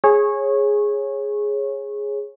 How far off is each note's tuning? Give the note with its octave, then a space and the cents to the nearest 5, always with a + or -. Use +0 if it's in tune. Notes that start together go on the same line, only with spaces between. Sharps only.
G#4 +0 C#5 -20